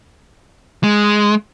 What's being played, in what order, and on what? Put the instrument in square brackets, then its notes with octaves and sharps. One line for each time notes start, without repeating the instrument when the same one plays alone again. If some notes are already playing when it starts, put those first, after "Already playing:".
[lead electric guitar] G#3